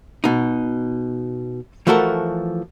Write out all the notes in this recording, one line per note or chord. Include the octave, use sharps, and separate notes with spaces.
B2 D#4
E3 F3 A3 F#4 A4 A#4